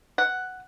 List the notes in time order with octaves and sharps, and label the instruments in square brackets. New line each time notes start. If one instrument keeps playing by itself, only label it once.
[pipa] F#5